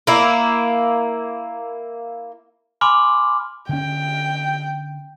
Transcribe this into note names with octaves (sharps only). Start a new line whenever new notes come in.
A#3 E4
G#5 B5 C6 D6 F6
D3 C#4 G5